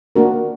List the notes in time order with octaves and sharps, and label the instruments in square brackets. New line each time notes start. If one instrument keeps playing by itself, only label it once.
[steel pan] A#3 D4 F#4 A#4